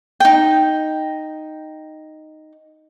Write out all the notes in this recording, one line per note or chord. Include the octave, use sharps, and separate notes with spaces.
D#4 G5